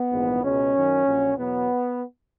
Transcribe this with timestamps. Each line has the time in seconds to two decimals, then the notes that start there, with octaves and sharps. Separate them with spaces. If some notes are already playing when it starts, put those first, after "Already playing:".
Already playing: B3
0.12 A#1 G#2 E3
0.43 C#2 B2 G#3 C#4
0.74 F#2 D#3 F#3
1.05 A#1 A#2 F#3
1.36 E2 B2 F#3 B3